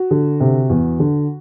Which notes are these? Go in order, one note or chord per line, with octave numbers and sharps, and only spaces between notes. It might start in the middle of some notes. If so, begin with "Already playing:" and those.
Already playing: F#4
D3
C3
E2
D3